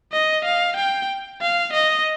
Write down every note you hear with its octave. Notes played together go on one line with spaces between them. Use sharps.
D#5
F5
G5
F5
D#5